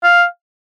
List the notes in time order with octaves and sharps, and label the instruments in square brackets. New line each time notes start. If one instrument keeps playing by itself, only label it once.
[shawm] F5